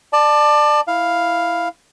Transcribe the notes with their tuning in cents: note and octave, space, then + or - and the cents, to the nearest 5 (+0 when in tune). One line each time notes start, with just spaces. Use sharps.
D5 +25 A5 +0
E4 +0 F5 +0